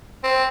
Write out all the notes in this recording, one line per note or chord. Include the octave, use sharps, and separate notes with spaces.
C4